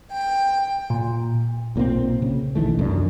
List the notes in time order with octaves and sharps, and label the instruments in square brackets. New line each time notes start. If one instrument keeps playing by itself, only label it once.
[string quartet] G5
[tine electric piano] A#2
[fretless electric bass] B1 A#2 A#3 C4
C#3
B1 D#3 E3 A3
C2 F#2 A#2 D4